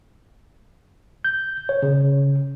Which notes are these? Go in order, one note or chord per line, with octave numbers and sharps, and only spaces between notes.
G6
C#5
C#3